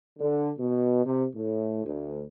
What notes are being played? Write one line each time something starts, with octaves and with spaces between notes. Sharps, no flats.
D3
B2
C3
A2
D2